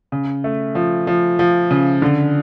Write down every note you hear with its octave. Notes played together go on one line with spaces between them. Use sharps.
C#3
A3
F3
F3
F3
C#3
D3